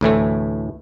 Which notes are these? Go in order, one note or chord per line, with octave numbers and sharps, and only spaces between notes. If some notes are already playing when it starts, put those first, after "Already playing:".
D2 A2 E3 A3